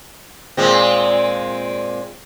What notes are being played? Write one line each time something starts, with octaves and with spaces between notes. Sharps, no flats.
A#2 G#3 C4